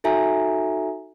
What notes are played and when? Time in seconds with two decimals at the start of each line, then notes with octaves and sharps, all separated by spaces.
0.04 D#4 F#4 A4 E5 G#5 A#5